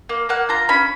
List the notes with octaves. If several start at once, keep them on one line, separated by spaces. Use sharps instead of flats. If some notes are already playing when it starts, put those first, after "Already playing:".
A#3
A#3 F#5
F4 A#5
C#4 B5